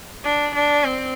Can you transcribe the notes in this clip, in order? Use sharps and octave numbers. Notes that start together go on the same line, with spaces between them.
D4
D4
C4